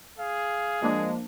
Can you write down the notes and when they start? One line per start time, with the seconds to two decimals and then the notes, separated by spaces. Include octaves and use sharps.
0.18 G#4 F5
0.82 F3 G#3 A#3 D4